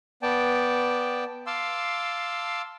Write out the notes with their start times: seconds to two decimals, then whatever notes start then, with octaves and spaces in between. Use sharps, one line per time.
0.22 B3 D5 G5 A5
1.47 F5 A5 C6 D6 E6